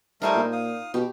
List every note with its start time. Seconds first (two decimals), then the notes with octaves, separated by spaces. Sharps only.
0.22 G3 A3 D#4 A#4 C5 G#5
0.35 A#2
0.53 F5 D#6
0.94 B2 G4